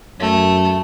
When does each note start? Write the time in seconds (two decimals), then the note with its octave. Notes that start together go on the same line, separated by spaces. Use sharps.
0.20 F#2 A3